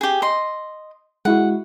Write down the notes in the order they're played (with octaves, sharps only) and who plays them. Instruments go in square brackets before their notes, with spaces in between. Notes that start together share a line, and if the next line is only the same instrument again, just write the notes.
[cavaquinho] G4 G#4
D#5 C6
[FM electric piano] G#3 E4 F#4 [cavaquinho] F#5